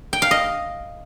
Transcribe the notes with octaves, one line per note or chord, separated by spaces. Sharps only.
G5
F5
D#5